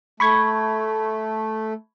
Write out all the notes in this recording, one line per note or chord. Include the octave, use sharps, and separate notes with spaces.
A3 B5 C#6 G#6